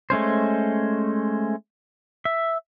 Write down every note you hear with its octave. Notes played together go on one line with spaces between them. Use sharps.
G#3 A3 C#4 C5
E5